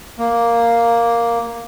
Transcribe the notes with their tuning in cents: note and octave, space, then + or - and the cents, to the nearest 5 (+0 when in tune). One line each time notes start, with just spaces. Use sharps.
A#3 +0